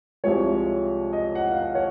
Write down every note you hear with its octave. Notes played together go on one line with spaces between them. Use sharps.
C2 C3 F3 G#3 C#5
D#5
F#5
F5
F#5
C#5